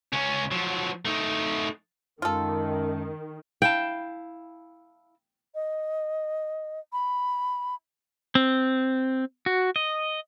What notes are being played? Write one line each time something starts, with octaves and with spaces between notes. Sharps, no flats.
C#2 C#4
F3 F#3
A3 D#4
F#2 D#3 G#3 F4 A4
E4 F5 G5 A5
D#5
B5
C4
F#4
D#5